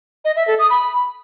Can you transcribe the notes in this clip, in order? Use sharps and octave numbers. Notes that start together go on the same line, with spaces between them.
D#5
E5
A4
D#6
B5